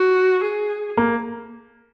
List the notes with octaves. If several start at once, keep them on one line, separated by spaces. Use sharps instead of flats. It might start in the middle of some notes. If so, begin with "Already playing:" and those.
Already playing: F#4
G#4
A#3